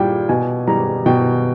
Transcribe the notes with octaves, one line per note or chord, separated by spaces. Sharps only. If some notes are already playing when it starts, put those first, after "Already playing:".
Already playing: A#2 G3 G5
B2 G#5
G3 A#5
B2 G5